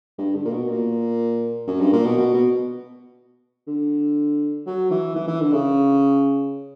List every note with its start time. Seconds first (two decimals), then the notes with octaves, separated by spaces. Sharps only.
0.18 G2
0.35 D3
0.45 A#2
0.52 B2
0.68 A#2
1.67 F#2
1.80 G2
1.92 A#2
2.05 B2
2.17 B2
2.34 B2
3.67 D3
4.66 F#3
4.91 E3
5.15 E3
5.27 E3
5.40 D3
5.52 C#3